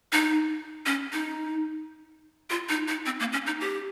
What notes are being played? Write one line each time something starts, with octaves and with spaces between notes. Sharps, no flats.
D#4
C#4
D#4
F4
D#4
D#4
C4
A#3
C#4
D#4
G4